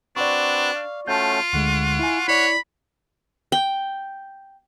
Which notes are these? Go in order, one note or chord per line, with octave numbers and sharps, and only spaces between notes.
C4 D4 F#4 B4 D5 C#6
F5
A3 C#4 F4 F#4 A5 G6
D2 D3 G#3 F#5 C#6
E4 G#5
E4 C#5 D5 B5
G5